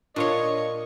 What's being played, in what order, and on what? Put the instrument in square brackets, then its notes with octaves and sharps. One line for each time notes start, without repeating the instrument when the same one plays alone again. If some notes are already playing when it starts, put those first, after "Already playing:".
[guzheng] A#2 C6 [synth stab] D4 F4 C#5 [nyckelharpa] D#5 C#6